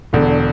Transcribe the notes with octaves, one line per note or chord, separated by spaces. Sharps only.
E1 E2 D3